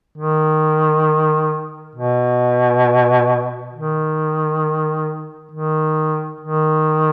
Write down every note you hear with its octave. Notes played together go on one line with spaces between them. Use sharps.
D#3
B2
D#3
D#3
D#3